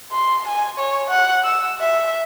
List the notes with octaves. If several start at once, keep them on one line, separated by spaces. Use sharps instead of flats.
C6
G#5
C#5
F#5
E6
E5